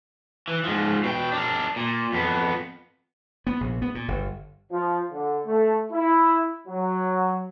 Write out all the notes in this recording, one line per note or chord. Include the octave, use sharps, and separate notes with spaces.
E3
G#2 F3
B2 G5
D4 A#4
A#2
F2 B3
B3
A#1
B3
A#2
G1
F3
D3
A3
E4
F#3